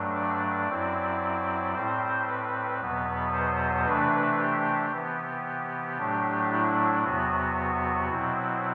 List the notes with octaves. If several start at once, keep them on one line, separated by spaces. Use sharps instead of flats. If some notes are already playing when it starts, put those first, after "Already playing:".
Already playing: G2 F#3 A3 D4
D5
F#2 F#3 C4 E4
A2 G3 C4 C5
B4
E2 B2 F#3 B3
C5
C3 E3 A3 D4 B4
G4
C3 E3 B3
A2 F#3 A3 D4
E4
E2 C3 F#3 B3 F#4
B2 F#3 C4 E4